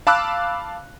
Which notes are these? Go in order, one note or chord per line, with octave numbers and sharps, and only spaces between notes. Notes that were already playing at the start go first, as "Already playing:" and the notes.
F5 A5 B5 D6 E6 F#6